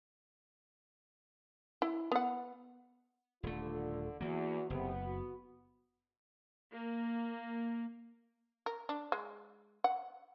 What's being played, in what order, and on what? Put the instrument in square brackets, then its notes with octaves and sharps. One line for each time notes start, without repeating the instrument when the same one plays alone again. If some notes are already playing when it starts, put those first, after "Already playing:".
[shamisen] E4
B3 F#5
[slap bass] D#1 A3 [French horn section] D3 [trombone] F4
[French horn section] E2 [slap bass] E3 A#3 [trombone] F#4
[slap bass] F#1 [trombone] C3 [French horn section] B3
[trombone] F#4
[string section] A#3
[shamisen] A#4
D4
G#3
F#5